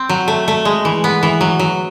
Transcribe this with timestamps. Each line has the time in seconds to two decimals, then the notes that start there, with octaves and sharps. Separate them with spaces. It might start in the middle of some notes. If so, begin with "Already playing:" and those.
Already playing: C4
0.09 F#3
0.28 A3
0.48 A3
0.65 G#3
0.85 E3
1.04 B3
1.23 E3
1.41 F#3
1.59 F#3